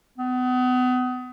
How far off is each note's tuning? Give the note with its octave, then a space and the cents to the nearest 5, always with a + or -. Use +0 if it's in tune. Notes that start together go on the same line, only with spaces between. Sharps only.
B3 +35